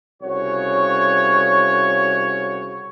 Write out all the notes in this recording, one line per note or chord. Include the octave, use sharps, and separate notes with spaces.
C2 C#3 F#4 C#5